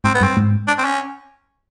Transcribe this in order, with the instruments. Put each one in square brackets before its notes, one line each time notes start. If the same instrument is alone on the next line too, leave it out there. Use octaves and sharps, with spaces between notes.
[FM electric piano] G#2 [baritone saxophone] C4
[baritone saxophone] B3
[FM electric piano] G2
[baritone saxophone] C4
[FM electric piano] G#2
[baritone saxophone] D4
C4
C#4